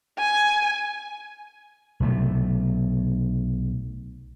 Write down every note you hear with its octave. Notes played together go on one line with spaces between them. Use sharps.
G#5
B1 C3 A3